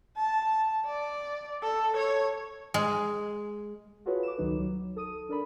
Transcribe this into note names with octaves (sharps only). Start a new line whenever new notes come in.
A5
D5
A4
C#5
G#3
F4 F#4 G#4 A4 B4 C#5
D6 E7
C#2 D#3 F#3 D#4 B4
F#3
A4 D#6 D#7
D4 A#4 D5 B5